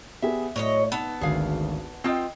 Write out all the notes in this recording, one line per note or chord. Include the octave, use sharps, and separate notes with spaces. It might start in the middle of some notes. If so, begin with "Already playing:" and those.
B3 G4 G#4 E5
A2 F#3 C#5 D#5
B3 D#4 A4
G#1 D2 G#4 F5
C4 F4 D#5 G5 D#6 C7